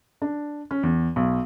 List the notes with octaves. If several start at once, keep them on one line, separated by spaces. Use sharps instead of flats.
D4
C#4
E2
B1